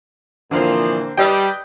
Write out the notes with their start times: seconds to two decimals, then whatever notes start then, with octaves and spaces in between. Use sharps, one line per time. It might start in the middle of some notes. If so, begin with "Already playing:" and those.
0.51 A#2 D3 E3 F3 A#3 C4
1.17 G3 B4 D#5 G5